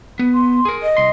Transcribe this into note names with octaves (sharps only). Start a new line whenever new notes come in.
B3
C6
G#4 A#4
D#5
C2 C6